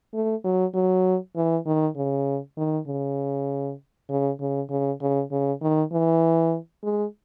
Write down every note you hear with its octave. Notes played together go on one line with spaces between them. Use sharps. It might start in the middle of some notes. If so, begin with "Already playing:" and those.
A3
F#3
F#3
E3
D#3
C#3
D#3
C#3
C#3
C#3
C#3
C#3
C#3
D#3
E3
G#3